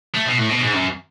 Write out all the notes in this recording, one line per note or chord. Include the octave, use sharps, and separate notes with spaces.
A3
B2
A2
B2
G#2
F#2